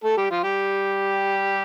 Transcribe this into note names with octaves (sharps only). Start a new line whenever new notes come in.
A3 A4
G3 G4
F3 F4
G3 G4